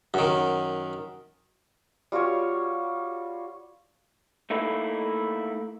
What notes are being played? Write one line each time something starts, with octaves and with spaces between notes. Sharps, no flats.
F#2 D#3
G3 F4 F#4 C#5
A3 A#3 D#4 E4